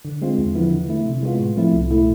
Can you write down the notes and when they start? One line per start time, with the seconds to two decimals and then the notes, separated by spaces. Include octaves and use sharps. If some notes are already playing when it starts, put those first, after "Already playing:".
0.05 D3
0.22 G#3 C4 F4
0.38 E2
0.55 D3 F3 B3 E4
0.72 D3
0.89 A3 E4
1.06 C3
1.23 G#3 B3 F4
1.39 A2
1.57 F3 A3 C4 E4
1.73 C2
1.90 B2 A3 E4